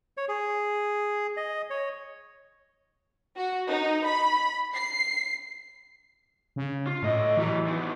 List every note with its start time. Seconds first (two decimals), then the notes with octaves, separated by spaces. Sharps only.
0.17 C#5
0.29 G#4
1.37 D#5
1.70 C#5
3.37 F#4
3.68 D#4
4.07 B5
4.74 C7
6.56 C#3
6.87 F4
7.03 C2 A2 D#5
7.37 E3 F#3 G3
7.67 D#3 B3